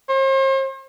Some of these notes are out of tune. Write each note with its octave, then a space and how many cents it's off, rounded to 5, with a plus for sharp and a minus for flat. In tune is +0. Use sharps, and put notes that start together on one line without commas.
C5 +45